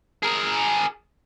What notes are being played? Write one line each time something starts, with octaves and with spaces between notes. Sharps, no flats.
G#4 A#4